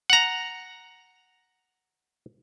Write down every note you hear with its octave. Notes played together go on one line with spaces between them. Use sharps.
F#5 A#5